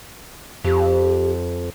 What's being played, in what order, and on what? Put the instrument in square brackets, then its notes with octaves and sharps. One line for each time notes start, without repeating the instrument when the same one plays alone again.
[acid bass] F2 [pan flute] G4